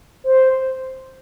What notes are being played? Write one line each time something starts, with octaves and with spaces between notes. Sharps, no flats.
C5